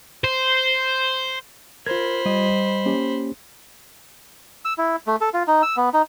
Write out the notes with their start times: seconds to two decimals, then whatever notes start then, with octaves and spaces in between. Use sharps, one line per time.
0.24 C5
1.86 F4 A#4 C5 B5 G#6
2.25 G3 D#5
2.86 A#3 C#4 G4
4.65 E6
4.78 E4
5.07 A3
5.21 A4
5.34 F4
5.47 D#4
5.62 E6
5.77 B3
5.94 D#4